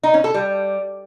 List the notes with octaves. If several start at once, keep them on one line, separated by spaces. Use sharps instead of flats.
D#4
C#4
A4
G3